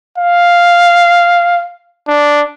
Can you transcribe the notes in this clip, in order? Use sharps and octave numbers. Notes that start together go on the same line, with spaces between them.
F5
D4